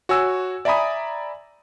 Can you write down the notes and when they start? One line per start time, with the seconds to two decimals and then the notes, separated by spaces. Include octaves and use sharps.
0.09 F#4 C#5 G#5 E6
0.65 D5 E5 G#5 A#5 B5 D#6